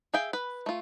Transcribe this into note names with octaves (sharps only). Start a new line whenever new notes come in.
G#4 E5 F5 G5
B4
A3 F4